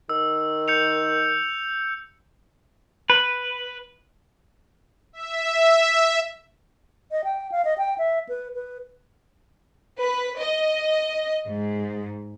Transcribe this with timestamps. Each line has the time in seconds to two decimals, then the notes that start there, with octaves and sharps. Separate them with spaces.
0.09 D#3 E6
0.68 G6 C#7 F7
3.10 B4
5.13 E5
7.12 D#5
7.24 G5
7.52 F5
7.65 D#5
7.78 G5
7.98 E5
8.29 B4
8.55 B4
10.00 B4
10.39 D#5
11.46 G#2